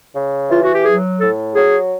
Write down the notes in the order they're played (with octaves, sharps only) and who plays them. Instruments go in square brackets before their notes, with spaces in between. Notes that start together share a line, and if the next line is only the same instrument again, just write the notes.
[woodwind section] C#3
E3 F4
F#4
G4
F#3 G#4
A2 A4
F#3 G#4